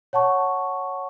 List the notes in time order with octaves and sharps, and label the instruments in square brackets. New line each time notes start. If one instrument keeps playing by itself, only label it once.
[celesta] C#5 F#5 A5 C#6